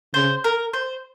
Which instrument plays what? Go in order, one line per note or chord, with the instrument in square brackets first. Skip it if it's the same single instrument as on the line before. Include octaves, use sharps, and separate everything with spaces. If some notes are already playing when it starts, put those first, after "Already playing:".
[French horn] C#3 [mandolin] C5
[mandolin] A#4
C5